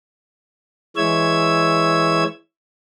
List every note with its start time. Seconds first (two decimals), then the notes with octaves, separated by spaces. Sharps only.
0.97 E3 G#3 C#5 E5 E6 G#6